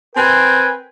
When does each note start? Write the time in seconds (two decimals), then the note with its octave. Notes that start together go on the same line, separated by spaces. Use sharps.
0.16 C4 A#4 B4 G5 G#5